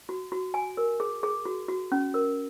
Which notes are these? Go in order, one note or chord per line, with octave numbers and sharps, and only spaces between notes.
F#4
F#4
G#5
A#4
G#4
G#4
F#4
F#4
C#4
A#4